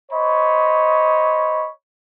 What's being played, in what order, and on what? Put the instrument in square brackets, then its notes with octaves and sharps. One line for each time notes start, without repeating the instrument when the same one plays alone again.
[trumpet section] C5 C#5 D#5 B5